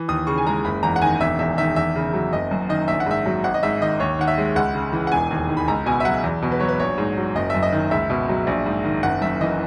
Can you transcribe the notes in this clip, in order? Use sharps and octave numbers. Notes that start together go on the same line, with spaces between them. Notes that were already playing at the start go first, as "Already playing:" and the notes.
Already playing: E3
D#2 D#6
C#3 C#6
G#5
G#3 A#5
F#1 B5
E2 A#5
F#5
D#3 G#5
E1 E5
E2 E5
D#3 E5
E2 E5
C#3
F#3
F#1 D#5
F#2
D#3 D#5
A#1 E5
F#5
G#2 E5
F#3
G#1 F#5
D#5
G#2 E5
D#3 D#5
D#2 C#5
D#3 F#5
E5
G#3
C#2 F#5
C#3
E3
F#5
E1 G#5
D#2
D#3
B5
C#2 A#5
B2 G#5
E5
F#3 F#5
E2
B2
B4
F#3 C#5
B4
A#1 C#5
G#2
F#3
F#1 D#5
F#2 E5
D#5
D#3
C#2 E5
B2
F#3
A#1
G#2
D#3
F#1 F#5
F#2 E5
E3 D#5